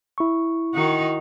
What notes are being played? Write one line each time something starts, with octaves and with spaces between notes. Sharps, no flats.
E4 C#6
D#3 D#4 F#4